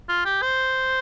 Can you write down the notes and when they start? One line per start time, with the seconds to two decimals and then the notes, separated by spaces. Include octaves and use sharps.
0.09 F4
0.25 G4
0.42 C5